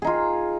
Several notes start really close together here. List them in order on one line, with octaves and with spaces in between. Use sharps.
G#4 D#4 F4